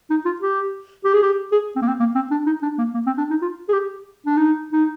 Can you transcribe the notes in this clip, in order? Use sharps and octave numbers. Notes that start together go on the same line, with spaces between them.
D#4
F4
G4
G4
G#4
G4
G#4
C4
A#3
C4
A#3
C4
D4
D#4
D4
A#3
A#3
C4
D4
D#4
F4
G#4
G4
D4
D#4
D#4